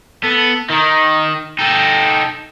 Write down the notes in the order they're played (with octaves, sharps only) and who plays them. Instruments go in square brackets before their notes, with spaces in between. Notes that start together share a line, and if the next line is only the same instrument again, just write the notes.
[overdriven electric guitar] B3 [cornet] A4
[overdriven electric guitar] D#3 [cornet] D#4
[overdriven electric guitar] D#4 A4 [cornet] G5